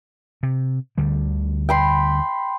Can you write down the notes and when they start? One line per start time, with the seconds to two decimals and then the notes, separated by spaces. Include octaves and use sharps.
0.43 C3
0.98 D2 D3 G3
1.69 G5 B5 C6